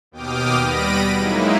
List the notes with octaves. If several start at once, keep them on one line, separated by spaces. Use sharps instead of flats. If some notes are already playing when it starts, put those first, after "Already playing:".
D#2 B2 G5 D6 D#6 F6
G3 B3 B5 A#6 D7 D#7
F#3 G#3 A#3 D#4 E4